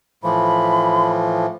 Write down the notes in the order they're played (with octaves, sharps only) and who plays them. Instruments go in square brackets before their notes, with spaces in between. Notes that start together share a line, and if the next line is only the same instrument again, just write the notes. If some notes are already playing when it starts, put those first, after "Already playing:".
[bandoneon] A2 E3 F3 [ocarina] B5